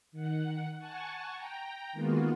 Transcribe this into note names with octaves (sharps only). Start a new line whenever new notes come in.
D#3 F#5
F#5 G#5 A5 C#6
G5 A#5
D#3 G#3 A#3 B3 F4 F#4